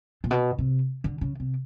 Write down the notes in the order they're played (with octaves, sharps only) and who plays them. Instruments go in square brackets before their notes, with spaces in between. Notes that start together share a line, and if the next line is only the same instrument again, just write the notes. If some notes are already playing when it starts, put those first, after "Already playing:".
[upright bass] A#2
B2
C3
D3
C#3
C3